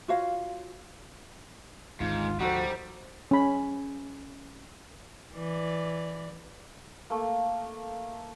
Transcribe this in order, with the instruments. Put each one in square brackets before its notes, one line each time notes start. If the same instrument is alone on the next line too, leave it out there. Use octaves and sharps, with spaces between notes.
[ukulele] F4 F#4 C#5 F5
[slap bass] G#1 D2 G#3 [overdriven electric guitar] G#2 [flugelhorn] F4
[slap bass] D2 F3 [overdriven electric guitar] G3 [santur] D#4 A4 C5 [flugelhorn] F#4
[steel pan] C#4 B5
[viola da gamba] E3 D5
[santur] A3 A#3